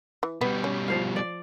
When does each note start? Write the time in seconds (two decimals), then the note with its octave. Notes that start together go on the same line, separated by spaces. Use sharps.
0.23 E3
0.41 B2 G3 B3
0.64 C#4
0.88 F3 C5 F5
1.16 D5